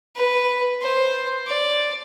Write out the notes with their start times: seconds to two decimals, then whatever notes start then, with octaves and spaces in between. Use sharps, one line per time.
0.16 B4
0.82 C5
1.47 D5